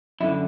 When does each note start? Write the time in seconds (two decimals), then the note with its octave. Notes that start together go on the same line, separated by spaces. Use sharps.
0.21 F#2 D3 E4